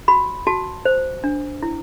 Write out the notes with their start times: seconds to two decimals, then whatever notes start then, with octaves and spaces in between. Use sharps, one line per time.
0.08 F#4 B5
0.47 F#4 A5
0.85 C5
1.24 D4
1.62 E4